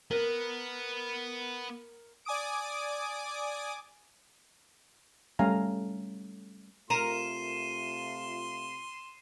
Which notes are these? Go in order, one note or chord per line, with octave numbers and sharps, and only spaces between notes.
B3 A#4 B4
D5 G#5 D6 D#6 D7
G3 A3 C#4 F5 G#5 A#5
C3 A3 F4 A#4 C6 C7 D#7 E7